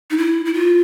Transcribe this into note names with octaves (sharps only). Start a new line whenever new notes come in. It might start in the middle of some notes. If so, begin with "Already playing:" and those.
D#4
E4
E4
F4